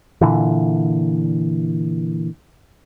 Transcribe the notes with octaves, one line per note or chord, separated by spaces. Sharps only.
A#2 D3 E3